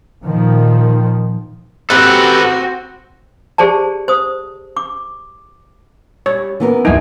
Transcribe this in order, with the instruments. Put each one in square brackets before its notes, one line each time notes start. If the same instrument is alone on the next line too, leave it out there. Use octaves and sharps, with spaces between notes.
[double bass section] A#2 D#3 F3
[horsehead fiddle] C4 F#4 [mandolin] G4 F#5 [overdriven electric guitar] A4 B4
[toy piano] G4 G#4 C5 D5 A5
C5 D#6
D6
[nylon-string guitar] G3 [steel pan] C#5
[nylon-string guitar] E3 B3 A#4
[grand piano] D1 B1 E4 [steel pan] D#4 G#5